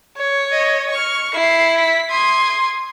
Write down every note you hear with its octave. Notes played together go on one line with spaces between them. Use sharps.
C#5
D#5
C#6 F6
E4 C7
B6
C6 D#6 G#6